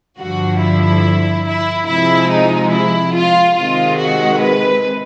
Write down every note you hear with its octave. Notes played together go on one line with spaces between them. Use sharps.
G2 D3 F3 F#4
E4
E4
C3 F3 G#3 E4
D#4
E4
F4
C3 D#3 G#3 F4
F#4
B4